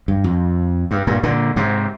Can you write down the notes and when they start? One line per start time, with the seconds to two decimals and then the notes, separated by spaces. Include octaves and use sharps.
0.08 G2
0.24 F2
0.91 G2
1.07 G2 A#2
1.23 A#2 D3
1.56 G#2 C3